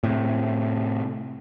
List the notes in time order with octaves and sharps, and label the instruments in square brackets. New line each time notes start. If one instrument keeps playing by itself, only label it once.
[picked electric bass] A2 C3